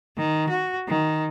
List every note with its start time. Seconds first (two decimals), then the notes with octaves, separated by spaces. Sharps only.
0.17 D#3
0.49 F#4
0.88 D#3